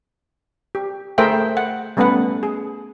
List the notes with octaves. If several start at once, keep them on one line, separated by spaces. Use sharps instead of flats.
G4
A3 G#4 A#4 C5 E5 G5
F#5
G3 A3 B3 C#4 B4 F#5
G#4